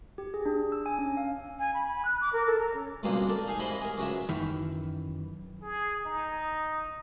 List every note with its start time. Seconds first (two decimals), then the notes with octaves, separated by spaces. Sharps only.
0.18 G4
0.34 G#4
0.46 D4
0.72 E6
0.86 G#5
0.99 C#4
1.17 F5
1.59 G#5
1.74 B5
1.88 B5
2.05 F#6
2.21 D6
2.32 A#4
2.47 A4
2.59 A#5
2.74 C#4
3.03 C#2 G2 B2 G#3 A#3 C4
3.29 A4 A#4 D5
3.46 D#4 G#4 F5 G#5 C#6
3.59 G#2 C3 E4 D#5 B5 C6
3.81 G#4 A#4
3.97 C#2 F#3 G#3 E5
4.29 F#2 D#3 E3
5.62 G#4
6.05 D#4